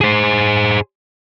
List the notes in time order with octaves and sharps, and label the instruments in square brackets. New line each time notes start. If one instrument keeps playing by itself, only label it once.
[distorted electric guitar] G#4 C5